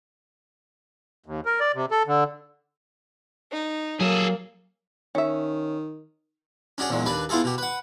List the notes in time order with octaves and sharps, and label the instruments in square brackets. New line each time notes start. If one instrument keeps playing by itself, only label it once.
[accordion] D#2
A#4
D5
C3
A4
D3
[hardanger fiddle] D#4
[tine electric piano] F#3 [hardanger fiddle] A#3 [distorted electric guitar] G#4 A4
[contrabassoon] D#3 [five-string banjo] C#4 E5
[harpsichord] C#4 D4 F#4 G#4
A#1 E2 F#3 G#3
D#2 D4 B4 D5
B3 E4 F4 G#4 A4
B2 G4
B4 F#5